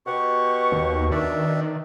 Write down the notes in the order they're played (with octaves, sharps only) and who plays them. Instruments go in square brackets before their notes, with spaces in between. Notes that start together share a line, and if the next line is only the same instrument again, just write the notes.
[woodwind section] B2 [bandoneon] G4 F#5 [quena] C#6
[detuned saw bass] D#2
[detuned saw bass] D#3 [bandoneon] D4 D5 E5